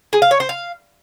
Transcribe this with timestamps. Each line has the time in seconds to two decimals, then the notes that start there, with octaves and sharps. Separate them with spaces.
0.13 G#4
0.22 F5
0.31 C#5
0.40 C5
0.49 F5